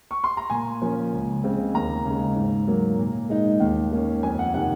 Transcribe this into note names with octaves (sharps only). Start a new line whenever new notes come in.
C#6
C6
A#5
A#2 G#5
F3 A#3 C#4
C#2
C#3 G#3 C4
D#2 A#5
C#3 G#3
G#2
F#3 A#3
A#2
G#3 D#4
D#2
D#3 A#3 C#4
F2 G#5
F#5
C3 D#3 F#5